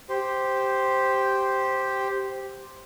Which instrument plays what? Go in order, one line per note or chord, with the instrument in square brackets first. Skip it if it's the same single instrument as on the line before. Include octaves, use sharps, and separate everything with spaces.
[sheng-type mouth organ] G4 C5